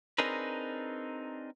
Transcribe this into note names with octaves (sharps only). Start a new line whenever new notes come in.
C4 D4 D#4 G#4 A#4 B4